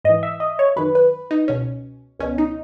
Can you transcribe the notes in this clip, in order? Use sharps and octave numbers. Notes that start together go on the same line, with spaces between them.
G#2 E3 D#5
E5
D#5
C#5
F#2 D#3 B4
B4
D#4
C#2 B2 C#4
C#2 B2 C#4
D#4